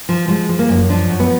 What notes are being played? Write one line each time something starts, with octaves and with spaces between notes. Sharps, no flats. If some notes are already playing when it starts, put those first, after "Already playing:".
F3
F3 G#3
F3
A#3
F#2
F3 D4
F#2
B3